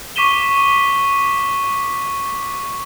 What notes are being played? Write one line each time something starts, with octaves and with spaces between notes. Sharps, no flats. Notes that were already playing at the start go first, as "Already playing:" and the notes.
C#6 D6 B6 D#7 E7 G7